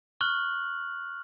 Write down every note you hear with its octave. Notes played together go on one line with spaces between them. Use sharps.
C#6 F6 F#6 F#7